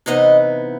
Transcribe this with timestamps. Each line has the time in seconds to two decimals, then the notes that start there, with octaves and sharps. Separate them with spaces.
0.06 C3 E3 B3 D#4 D#5